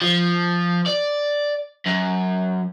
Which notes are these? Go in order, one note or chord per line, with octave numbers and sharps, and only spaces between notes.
F3
D5
F#2